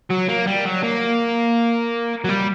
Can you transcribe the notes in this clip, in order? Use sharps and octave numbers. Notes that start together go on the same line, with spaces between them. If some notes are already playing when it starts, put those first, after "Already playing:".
F#3
A#3
G3
F#3
A#3
F#3
G3